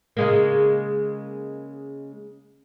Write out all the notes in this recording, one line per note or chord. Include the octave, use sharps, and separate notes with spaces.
C#3 G#3 A#3